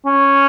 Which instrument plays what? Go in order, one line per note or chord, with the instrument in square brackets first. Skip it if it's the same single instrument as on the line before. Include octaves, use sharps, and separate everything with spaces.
[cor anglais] C#4